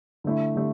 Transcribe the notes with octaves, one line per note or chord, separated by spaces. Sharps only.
D3 A3 E4
D3 A3